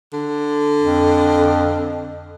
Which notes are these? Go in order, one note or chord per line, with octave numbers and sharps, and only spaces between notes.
D3
F2